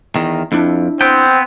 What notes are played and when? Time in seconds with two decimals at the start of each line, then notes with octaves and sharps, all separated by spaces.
0.16 E2 D#3
0.52 F2 D4 E4
1.01 B3 C4 G5